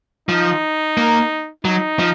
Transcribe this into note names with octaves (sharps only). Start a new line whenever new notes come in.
F3 D#4
A#3
F#3 D#4
F3